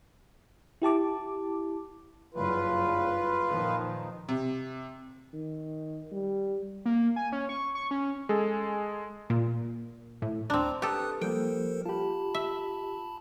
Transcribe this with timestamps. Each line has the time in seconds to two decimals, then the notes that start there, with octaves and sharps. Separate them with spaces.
0.82 E4 G4 A5 D6
2.34 F#1 G2 F4 B4
3.49 A#2 D#3 F3
4.29 C3
5.34 D#3
6.12 G3
6.85 A#3
7.16 G#5
7.32 C#4
7.49 C#6
7.75 C#6
7.91 C#4
8.29 G#3 G#4 A4
9.30 A#2
10.22 A2
10.50 D2 C4 D4 A#5
10.82 G4 A4 B4 D#6 F#6
11.21 F3 G3 A#3 A4 A#4 C5 G5
11.86 F4 G4 A5 B5
12.35 E5